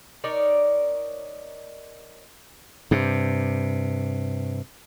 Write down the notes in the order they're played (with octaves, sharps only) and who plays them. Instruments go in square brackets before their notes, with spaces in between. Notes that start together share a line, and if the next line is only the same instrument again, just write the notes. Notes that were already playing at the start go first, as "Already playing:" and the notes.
[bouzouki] D#4 A#4 C#5 D5
[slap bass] G2 C3